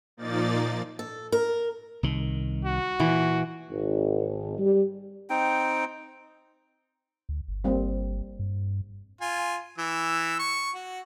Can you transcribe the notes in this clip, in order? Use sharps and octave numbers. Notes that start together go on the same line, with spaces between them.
A#2 F3 A#3 D#4 D5 A6
A4
A#4
C2 D#3
F#4
A#2 E3
G#1
G3
C4 D#4 G5
D2
G1
G3 A#3 C4
G2
F4 G#5
E3 E6
C#6
F#4